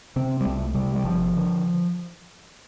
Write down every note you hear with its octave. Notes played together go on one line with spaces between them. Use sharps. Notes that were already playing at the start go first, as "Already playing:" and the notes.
C3 C4
G3
C2 A3
C3 G3
G3
G1 F3
D3